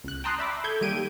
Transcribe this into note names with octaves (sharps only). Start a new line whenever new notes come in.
C#2 F#6
G5 A5 A#5 C6 D#6 F#6
D5 E5 B5 D6
A4 G6 G#6
D#3 G3 A#3 G4 D7 D#7